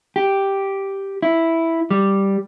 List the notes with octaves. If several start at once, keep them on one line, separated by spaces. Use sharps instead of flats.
G4
E4
G3